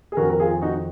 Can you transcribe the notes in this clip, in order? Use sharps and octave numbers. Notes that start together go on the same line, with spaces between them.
G#4
F2 D#3 F#4 A#4
A#4
F4 G#4
D#4 F#4